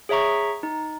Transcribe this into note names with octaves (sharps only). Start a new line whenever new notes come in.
G#4 C#5 E5 A#5 C#6
D#4